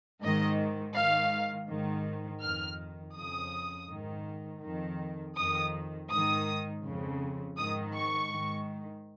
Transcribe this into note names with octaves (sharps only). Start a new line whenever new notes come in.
G#2 D#3 D#5
G#2 D#3 F5
G#2 D#3
F2 D#3 F6
F2 C#3 D#6
G#2 D#3
F2 D#3
F2 D#3 D#6
G#2 D#3 D#6
F2 C#3
G#2 D#3 D#6
C#6
G#2 D#3